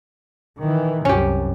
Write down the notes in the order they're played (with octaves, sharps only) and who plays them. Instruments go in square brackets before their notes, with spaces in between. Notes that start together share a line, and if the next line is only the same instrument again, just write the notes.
[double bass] D#3 E3
[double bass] C2 F#2 [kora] C#4 G4